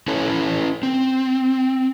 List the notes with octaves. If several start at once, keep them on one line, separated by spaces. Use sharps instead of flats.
C#4 E4 A4 B4 C#5
C4